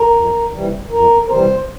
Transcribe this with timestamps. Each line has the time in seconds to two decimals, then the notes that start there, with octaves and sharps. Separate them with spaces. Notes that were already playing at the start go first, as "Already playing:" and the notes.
Already playing: A#4
0.14 F2
0.52 C3 E3 G3
0.91 F2 A#4
1.25 A#4
1.29 C3 E3 G3 C5